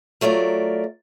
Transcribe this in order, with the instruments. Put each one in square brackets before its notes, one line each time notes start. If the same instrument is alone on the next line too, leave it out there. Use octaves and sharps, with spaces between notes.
[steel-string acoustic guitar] F#3 A3 F4 A#4 D5